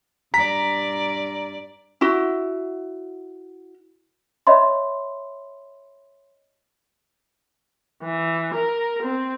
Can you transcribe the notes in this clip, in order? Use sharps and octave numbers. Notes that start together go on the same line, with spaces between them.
G2 D5 A#5 B6
E4 F#4
C#5 D#5 E5 B5 C6
E3
A#4
C4